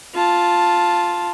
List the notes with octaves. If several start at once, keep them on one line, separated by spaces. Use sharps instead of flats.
F4 A5